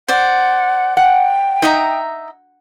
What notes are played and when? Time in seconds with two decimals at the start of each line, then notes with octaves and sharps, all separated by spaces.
0.08 C5 D5 F#5
0.97 F#5 G5
1.62 D#4 D#5 E5 A#5